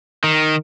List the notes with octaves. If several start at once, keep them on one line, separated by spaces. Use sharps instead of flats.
D#3